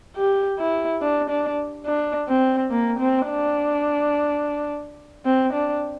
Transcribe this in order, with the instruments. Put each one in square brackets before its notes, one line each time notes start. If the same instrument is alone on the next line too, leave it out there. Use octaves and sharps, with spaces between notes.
[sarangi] G4
E4
D4
D4
D4
C4
A#3
C4
D4
C4
D4